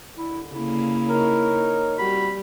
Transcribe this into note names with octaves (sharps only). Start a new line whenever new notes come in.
D#2 D3 E4
C#3 A#3 E4
D#4 A#4 C#5
G3 C4 E4 F#4 B5